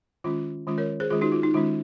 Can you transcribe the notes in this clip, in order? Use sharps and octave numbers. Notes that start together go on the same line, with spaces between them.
D#3 G#3 C#4 F4
D#3 G#3 C#4 F4
A#4 C#5
G#4 C5
D#3 G#3 C#4 F4 G#4
D#4 F#4
F4
D#4
D#3 G#3 C#4 F4